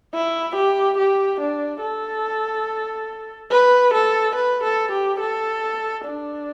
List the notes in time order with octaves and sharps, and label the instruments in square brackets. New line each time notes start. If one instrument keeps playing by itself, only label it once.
[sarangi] E4
G4
G4
D4
A4
B4
A4
B4
A4
G4
A4
D4